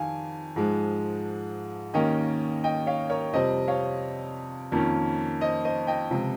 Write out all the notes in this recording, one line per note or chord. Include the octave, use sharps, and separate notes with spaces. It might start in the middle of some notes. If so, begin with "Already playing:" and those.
Already playing: F2 D#3 G3 F5 G#5
G#2 F3 G#3
D#2 D#3 A#3 C#4 D#5 G5
D#5 G5
C#5 F5
A#4 C#5
F2 C3 G3 C4 C5 D#5
C#5 F5
F2 D#3 A#3 C#4
C5 D#5
C5 D#5
D#5 G5
C#2 C3 F3